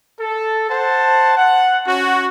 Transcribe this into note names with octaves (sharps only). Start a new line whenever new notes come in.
A4
C5 F#5 A5
F#5
C#4 F#4